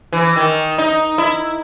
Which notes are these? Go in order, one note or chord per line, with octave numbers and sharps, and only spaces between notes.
E3
D#3
D#4
E4